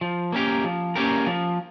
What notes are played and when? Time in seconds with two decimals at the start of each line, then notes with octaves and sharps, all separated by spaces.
0.01 F3
0.32 A#3 C#4 G4 A#4
0.64 F3
0.95 A#3 C#4 G4 A#4
1.26 F3